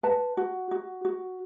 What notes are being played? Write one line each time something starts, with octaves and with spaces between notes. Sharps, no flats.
B4 A5
F#4
F#4
F#4